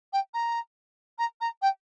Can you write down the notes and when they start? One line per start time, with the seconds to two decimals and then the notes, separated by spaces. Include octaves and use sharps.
0.13 G5
0.34 A#5
1.18 A#5
1.41 A#5
1.62 G5